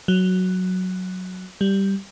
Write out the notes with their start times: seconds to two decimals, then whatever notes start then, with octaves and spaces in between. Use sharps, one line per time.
0.08 F#3
1.61 G3